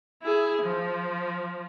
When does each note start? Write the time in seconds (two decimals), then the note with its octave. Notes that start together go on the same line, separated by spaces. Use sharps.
0.22 E4 G#4
0.62 F3